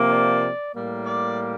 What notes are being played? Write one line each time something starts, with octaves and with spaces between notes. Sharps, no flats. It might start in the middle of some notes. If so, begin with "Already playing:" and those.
Already playing: C3 F3 A#3
D5
A2 G3 A#3
D5